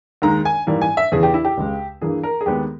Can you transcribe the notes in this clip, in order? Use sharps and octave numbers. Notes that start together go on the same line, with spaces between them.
D#2 D#3 G#3 A#5
G#5
G#2 E3 G3 A#3
G#5
E5
E2 C#3 E3 G#4
G4
E4
G4
C#2 C#3 G#3
G2 E3 A#3 G#4
A#4
G#4
D#2 D#3 G#3 B3 G4